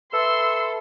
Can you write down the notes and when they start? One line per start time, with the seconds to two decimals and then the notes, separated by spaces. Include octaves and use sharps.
0.13 A4 B4 E5 B5 C6 E6